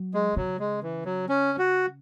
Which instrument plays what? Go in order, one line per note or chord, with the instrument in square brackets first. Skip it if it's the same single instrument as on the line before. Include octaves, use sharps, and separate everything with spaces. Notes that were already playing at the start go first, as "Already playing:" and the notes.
Already playing: [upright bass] F#3
[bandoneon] G#3
[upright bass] C#3 [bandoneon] F#3
[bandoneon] G#3
E3
F#3
C#4
F#4